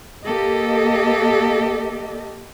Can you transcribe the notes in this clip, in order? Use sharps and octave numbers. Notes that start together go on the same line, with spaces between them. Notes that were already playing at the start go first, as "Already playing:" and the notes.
A#3 G4 A4 D#5